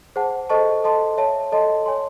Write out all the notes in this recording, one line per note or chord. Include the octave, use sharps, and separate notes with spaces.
G#4 C5 F#5 A5
A4 C5 D#5 A5 C#6
A4 D#5 A5 C6
C#5 E5 A5
A4 D#5 A5 C6
C#5 G#5 C6